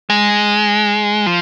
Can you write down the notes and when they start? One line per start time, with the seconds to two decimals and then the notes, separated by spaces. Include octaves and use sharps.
0.10 G#3
1.26 F3